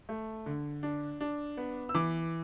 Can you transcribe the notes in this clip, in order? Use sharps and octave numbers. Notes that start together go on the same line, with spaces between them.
A3
D3
D4
D4
B3
E6
E3 D6